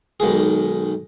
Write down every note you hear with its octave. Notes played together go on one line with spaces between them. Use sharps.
B1 D#3 G#3 G#4